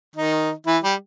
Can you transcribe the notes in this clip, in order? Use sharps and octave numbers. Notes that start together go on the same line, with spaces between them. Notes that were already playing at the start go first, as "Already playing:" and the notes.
D#3 D#4
E3 E4
G3 G4